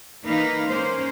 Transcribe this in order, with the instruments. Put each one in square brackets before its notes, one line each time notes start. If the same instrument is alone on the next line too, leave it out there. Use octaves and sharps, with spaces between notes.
[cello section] E3 A#3 D#4 B4 F5
A#3 C#4 C5